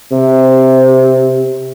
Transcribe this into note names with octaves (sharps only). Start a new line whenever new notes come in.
C3